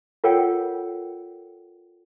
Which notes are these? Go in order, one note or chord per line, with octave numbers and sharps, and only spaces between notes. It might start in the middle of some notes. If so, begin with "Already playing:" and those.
F4 A4 A#4 C#5 F#5 G5